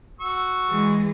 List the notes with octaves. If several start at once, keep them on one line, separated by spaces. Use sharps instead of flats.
F#4 C#6 E6
E3 G#3